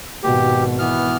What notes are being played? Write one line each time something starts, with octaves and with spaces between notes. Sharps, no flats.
G#1 B2 G4
E3 B3 F6